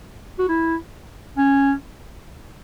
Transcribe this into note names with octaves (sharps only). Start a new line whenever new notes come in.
F#4
E4
C#4